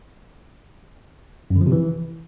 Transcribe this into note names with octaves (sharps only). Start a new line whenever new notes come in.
F#2
D3
F3
C3
E3